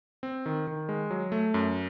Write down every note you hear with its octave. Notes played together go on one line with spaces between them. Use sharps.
C4
D#3
D#3
G#3
F#3
A3
F#2